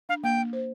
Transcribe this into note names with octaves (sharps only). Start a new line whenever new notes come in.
D4 F5
A#3 G5
A#3
C5